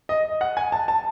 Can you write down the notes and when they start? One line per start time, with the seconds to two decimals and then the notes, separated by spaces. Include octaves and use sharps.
0.09 D#5
0.41 F#5
0.57 G#5
0.72 A5
0.88 A5